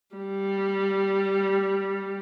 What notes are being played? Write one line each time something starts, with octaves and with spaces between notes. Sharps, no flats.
G3